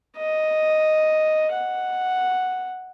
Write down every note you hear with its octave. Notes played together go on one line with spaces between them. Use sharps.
D#5
F#5